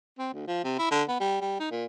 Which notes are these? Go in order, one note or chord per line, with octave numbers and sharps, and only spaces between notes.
C4
D2
F3
C3
E4
D3
B3
G3
G3
D#4
A#2